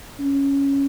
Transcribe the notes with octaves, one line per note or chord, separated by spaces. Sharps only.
C#4